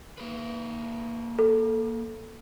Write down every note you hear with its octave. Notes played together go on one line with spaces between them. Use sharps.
A#3 G#4 B4
A4